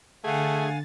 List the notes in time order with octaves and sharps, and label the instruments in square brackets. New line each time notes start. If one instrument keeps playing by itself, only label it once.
[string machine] D3 A6 [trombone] A3 [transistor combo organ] G#4 [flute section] F5 F#5 G#5